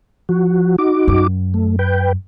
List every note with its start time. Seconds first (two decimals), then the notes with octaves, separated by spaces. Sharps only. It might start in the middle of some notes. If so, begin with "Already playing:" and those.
0.29 F3 F#4
0.78 D#4 F#4 D6
1.08 F#2
1.54 A3
1.79 B4 G5